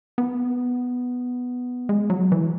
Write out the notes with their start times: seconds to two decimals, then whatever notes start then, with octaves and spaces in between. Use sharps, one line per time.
0.18 B3
1.89 G#3
2.10 F#3
2.32 E3